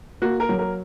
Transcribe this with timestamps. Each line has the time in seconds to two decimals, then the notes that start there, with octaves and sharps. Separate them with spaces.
0.22 A#3 F#4
0.40 A#4
0.49 F#3
0.59 A#4